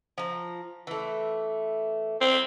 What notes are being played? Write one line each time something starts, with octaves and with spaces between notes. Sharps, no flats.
F3 A#5
E3 A3
C4